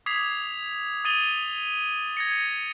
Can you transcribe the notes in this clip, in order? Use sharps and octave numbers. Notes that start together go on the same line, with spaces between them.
D6 D#6 G#6 B6 C7 F7
D#6 A6 D#7 F7 G7
G#6 A#6 C#7